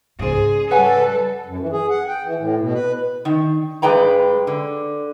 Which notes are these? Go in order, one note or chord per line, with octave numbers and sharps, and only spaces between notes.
G#2 C#3 G#4 C5 D5
G3 A4 B4 C#5 F#5 G#5
F#2
E3
G#4
F#5
G5
E3
A2
B2
B4
D#3
G2 G#3 B4 G5 A#5
D3